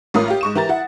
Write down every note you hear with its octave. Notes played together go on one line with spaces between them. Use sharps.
A1 A2 F4 A#4 D#6
G4 F5
G#2 C#6 E7
E3 G4 A#4 A#5 A6
E4 F#5